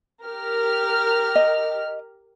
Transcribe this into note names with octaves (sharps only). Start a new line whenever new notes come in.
G4 A#4 F6
D#5